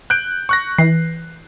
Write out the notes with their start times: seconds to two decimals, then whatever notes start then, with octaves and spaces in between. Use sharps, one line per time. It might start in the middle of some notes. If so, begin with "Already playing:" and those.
0.10 F#6 G6 D7
0.49 C#6 F#6 A#6
0.78 E3 C7